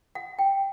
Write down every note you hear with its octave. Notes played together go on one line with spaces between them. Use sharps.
F#5
G5